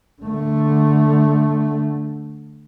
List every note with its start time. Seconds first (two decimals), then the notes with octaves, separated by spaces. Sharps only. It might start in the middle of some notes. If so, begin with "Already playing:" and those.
0.23 D3 A3